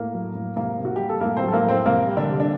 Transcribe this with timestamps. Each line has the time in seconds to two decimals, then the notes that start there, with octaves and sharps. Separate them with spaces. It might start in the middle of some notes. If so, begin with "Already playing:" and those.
Already playing: A2 A#3 A#4
0.14 F#3
0.35 A2
0.56 C3 A#3 A#4
0.78 C3
0.85 F#4
0.96 G3 G4
1.09 A4
1.20 A2 A#3 A#4
1.37 C4 C5
1.43 F#3
1.48 A4
1.52 A#3 A#4
1.63 A2
1.69 C4 C5
1.86 C3 A#3 A#4
2.07 G3
2.17 D3 D4
2.28 C3
2.40 D4